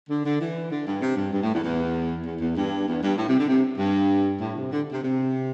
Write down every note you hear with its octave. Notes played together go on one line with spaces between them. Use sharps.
D3
D3
E3
D3
G2
C3
G2
G2
A2
E2
E2
E2
E2
G2
E2
G2
A2
C3
D3
C3
G2
A2
C3
D3
C3
C3